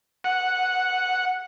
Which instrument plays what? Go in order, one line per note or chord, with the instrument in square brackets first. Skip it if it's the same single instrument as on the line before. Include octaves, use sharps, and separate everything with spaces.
[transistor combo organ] F#5